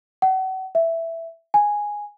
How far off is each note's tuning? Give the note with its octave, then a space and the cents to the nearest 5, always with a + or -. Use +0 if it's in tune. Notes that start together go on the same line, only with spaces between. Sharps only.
F#5 +35
E5 +5
G#5 -5